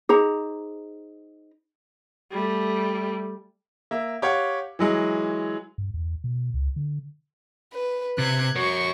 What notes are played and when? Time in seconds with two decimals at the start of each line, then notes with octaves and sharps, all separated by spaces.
0.09 D#4 G#4 C5 A#5
2.32 G3 A3
3.91 A#3 E5
4.22 G4 C#5 F5 F#5
4.79 E3 F#3 G#3
5.78 G2
5.94 E2
6.24 B2
6.54 C#2
6.76 D3
7.73 B4
8.18 C3 F#6 G#6
8.56 F#4 A#4 C#5 C#6